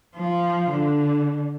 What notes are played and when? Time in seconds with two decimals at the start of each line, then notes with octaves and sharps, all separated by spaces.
0.17 F3 F4
0.71 D3